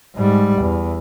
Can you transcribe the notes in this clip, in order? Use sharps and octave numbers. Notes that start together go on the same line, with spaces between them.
G#2 G3
E2